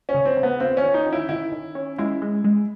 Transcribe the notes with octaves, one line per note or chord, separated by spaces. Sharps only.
C#4
C#3
C4
C#3
B3
C4 F4
C#4
D#3
D#4
C#4
E4
D#3 E4
D#3
C#4
G#3 E4
G#3
G#3